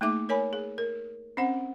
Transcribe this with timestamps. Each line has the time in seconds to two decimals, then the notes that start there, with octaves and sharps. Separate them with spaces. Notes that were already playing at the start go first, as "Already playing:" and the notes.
0.01 A3 A#3 D#4 G#4 E5 D6
0.29 A#4 C#5 G#5 B5
0.53 G#4
0.78 A#4
1.37 C4 C#4 C5 F#5